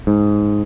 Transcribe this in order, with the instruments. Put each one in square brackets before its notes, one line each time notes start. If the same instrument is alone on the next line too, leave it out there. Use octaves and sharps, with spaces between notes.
[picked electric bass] G#2